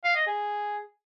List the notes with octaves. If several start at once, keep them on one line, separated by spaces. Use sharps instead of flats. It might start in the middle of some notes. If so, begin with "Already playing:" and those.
F5
D#5
G#4